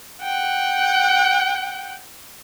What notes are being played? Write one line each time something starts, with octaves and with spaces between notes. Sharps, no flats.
F#5 G5